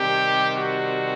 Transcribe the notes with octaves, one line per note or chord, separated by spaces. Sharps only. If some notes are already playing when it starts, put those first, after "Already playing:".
Already playing: C3 D#3 G3 G4
F#4